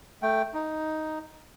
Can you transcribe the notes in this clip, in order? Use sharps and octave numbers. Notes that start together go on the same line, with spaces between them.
A3 G5
D#4